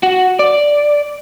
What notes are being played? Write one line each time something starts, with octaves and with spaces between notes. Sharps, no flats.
F#4
D5